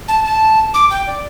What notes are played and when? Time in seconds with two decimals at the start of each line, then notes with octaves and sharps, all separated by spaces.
0.08 A5
0.24 A5
0.74 D6
0.90 G5
1.07 D5